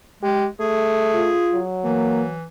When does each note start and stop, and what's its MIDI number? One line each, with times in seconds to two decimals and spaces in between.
0.23 0.48 56
0.23 0.46 67
0.60 1.33 57
0.60 1.66 68
1.14 1.59 65
1.53 2.36 54
1.84 2.45 52
1.84 2.24 58